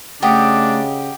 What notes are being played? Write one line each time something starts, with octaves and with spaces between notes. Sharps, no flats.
C#3 A3 D4 F#4 G4 D#5